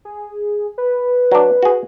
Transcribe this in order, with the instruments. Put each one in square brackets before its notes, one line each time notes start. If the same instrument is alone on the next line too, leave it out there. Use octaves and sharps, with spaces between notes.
[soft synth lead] G#4
B4
[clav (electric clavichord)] F#3 D4
F#4 G#4